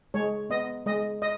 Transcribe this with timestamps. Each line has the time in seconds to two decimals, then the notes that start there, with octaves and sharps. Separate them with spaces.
0.14 G#3 C#5
0.50 B3 D#5
0.86 G#3 D#5
1.22 D#5